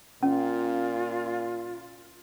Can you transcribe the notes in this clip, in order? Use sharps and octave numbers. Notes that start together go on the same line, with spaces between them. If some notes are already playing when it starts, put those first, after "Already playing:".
A#2 C#4 F4